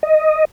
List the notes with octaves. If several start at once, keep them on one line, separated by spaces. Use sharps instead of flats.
D#5